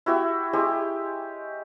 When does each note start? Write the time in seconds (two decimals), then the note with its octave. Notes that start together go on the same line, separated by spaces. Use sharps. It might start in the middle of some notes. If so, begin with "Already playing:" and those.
0.06 E4 F#4 G4 E5
0.53 G#3 E4 G4 C#5